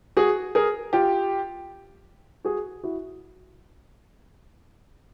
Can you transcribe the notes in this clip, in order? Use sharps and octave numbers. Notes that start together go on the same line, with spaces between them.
F#4 G#4
G#4 A#4
F4 G4
F#4 G#4
E4 F#4